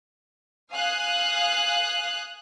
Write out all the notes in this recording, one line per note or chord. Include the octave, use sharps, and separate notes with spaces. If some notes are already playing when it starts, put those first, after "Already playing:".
F5 G#5 D#6 F#6